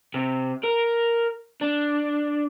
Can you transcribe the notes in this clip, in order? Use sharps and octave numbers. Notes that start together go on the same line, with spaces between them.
C3
A#4
D4